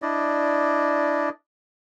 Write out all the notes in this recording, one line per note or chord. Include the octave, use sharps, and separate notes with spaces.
D4 E4 D5 D#5